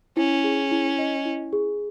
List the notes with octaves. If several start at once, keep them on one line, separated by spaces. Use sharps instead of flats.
C#4 E4
G#4
E4
D#5
E4
G#4